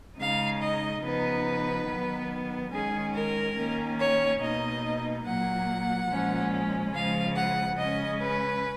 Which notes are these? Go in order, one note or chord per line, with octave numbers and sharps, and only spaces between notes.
C#3 G#3 D#4 F5
D#5
C#3 F3 B3 D#4 B4
D#3 F#3 B3
D#3 G#3 C#4 G#4
A#4
D#3 A#3 C#4
C#5
B2 A#3 D#4 D#5
A#2 F#3 A#3 F#5
A#2 F3 G#3 C#4
C#3 F3 G#3 F5
F#5
C#3 G#3 C#4 D#5
B4